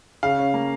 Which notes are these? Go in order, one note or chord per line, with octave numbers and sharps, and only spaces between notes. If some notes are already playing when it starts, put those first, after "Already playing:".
C#3 F5
C#4
A#3